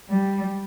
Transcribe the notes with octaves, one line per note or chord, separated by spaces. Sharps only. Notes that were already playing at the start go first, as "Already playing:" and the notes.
G3